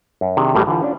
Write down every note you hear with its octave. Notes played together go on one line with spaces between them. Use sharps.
F#2
C3 D#3 D4 G4 G#4
A1 A2 G3 F#4 G#4 F#5
D3 E3 F4 A4
C#4 D4 F4